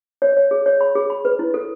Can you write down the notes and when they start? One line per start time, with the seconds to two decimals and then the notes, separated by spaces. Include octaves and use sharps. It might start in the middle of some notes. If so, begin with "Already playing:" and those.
0.22 C#5
0.37 C#5
0.51 G#4
0.66 C#5
0.81 B5
0.95 G#4
1.10 B5
1.25 B4
1.39 E4
1.54 A4